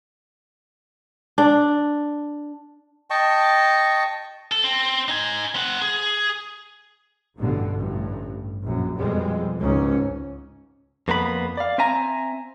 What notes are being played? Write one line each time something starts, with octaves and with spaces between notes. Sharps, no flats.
D4
D#5 G5 A5 C#6
A4
C4
D#4 G#5
C4 F#5
G#4
A1 G2 B2 D3
A1 G2
A#1 F#2
F2 B2 G3 G#3
G#1 C#2 G#2 C#4
F2 A#3 B3 F4 B5
D5 F5
C4 E5 G#5 A#5